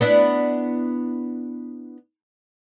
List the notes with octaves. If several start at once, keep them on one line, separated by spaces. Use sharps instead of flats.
B3 D4 E4